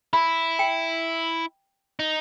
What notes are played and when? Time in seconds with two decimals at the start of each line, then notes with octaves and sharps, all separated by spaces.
0.13 E4 B5
0.59 G5
2.00 D#4